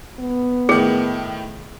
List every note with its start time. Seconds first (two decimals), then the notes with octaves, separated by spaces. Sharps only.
0.19 B3
0.69 A2 D#3 G#4